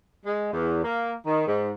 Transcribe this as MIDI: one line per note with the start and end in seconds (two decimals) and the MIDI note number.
0.25 0.53 56
0.53 0.81 40
0.84 1.13 58
1.26 1.46 51
1.47 1.71 44